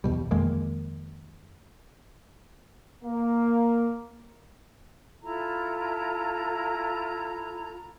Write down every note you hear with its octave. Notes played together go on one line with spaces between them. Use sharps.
E2 B2 G3
F2 D#3 G#3 A#3
A#3
E4 F4 A4 A#5